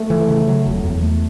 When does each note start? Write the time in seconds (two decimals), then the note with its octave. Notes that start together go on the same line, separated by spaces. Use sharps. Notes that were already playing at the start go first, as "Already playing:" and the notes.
Already playing: A3
0.10 E3
0.28 C#3
0.47 F#3
0.66 E1
0.84 E2
1.03 A3